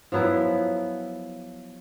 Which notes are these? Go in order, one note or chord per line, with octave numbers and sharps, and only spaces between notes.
F3 F#3 B3 E4